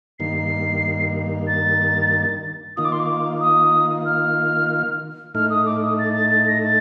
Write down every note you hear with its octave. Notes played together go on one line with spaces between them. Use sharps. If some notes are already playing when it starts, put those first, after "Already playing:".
G2 D#3 A#3 C7
A6
D#3 A#3 F4 D#6
D6
C6
D6
D#6
F6
A2 A3 D#4 F6
D#6
D6
D#6
A6
A6
A6
A#6
A6